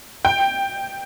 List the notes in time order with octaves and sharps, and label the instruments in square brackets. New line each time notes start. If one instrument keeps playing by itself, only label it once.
[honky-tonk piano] G5